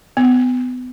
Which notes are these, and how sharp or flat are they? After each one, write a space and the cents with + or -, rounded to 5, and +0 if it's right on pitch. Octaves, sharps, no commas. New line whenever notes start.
B3 +30